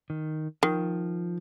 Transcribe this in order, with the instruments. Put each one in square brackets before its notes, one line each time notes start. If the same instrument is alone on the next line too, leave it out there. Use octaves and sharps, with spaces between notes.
[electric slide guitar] D#3
[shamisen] D#3 [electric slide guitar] F3